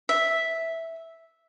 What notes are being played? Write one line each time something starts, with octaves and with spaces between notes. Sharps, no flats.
E5